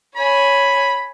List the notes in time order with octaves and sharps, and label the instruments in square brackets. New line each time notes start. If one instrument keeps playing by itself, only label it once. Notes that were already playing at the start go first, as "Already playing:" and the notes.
[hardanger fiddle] C#5 G#5 [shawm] B5